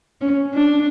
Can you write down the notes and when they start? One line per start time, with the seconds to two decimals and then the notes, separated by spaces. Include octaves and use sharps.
0.22 C#4
0.54 D4